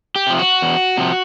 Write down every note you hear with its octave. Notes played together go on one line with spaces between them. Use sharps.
G4
C3 F3
F#4
E2
C3 F3